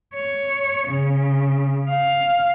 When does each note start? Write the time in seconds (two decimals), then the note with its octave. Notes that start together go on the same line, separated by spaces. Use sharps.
0.14 C#5
0.88 C#3
1.90 F5